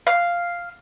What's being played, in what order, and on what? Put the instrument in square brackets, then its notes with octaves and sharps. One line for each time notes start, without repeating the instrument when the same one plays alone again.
[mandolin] F5